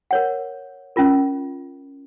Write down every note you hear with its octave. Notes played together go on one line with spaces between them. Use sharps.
A#4 C#5 F#5
C#4 F4 A#4